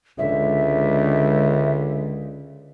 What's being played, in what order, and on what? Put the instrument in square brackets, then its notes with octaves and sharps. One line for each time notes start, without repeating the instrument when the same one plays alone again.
[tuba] C#2 [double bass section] D3 G#3 [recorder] E5